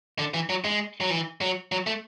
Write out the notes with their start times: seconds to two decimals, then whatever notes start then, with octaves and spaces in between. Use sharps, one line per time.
0.19 D3
0.34 E3
0.49 F#3
0.65 G#3
1.01 F#3
1.10 E3
1.41 F#3
1.72 F#3
1.87 A3